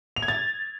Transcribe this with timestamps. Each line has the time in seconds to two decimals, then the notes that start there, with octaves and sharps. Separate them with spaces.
0.16 F7
0.22 G#6
0.28 A6